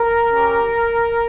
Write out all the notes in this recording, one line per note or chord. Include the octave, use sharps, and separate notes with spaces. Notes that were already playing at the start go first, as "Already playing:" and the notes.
Already playing: A#4
C#4 G4